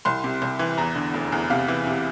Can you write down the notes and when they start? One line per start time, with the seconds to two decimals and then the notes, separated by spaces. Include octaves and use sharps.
0.05 C2 C6
0.24 C3
0.42 C2
0.59 E3
0.78 E2 A#5
0.95 D3
1.14 F1
1.32 E2
1.50 C3 F5
1.68 E3
1.87 C3